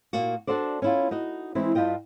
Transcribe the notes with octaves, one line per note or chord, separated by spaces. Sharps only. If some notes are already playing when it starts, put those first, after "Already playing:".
A#2 A#3 F#4
D4 F#4 A4 C5 D5
C#4 E4 F4
D#4 F#4 D#5
E3 G#3 C4 E4
G2 G3 F4 D#5 G5